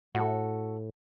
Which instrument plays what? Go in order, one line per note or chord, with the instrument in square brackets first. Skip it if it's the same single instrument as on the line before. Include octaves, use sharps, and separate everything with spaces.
[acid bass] A2 [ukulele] F#4 A4